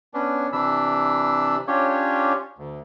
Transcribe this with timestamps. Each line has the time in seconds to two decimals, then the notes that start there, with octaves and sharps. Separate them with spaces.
0.14 B3 C#4 D4
0.53 C3 E3 D4 B5 E6
1.67 C#4 D4 F4 G4 C#5
2.58 D2